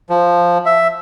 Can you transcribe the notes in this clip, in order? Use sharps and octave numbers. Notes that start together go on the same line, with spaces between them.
F3
E5